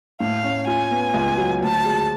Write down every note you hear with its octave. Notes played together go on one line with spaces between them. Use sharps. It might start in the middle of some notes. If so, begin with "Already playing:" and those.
A2 F5
C#4
F4 G#5
B3
C#2
F#3
D2 A5
G#3